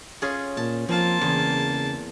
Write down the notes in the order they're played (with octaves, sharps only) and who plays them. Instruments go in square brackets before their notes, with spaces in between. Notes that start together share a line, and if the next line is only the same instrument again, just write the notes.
[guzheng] C#4 F4 G#4
[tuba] A#2 [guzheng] A5
[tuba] F3 [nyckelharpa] A#3 A5 [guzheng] C4 F4
[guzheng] E2 [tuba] C#3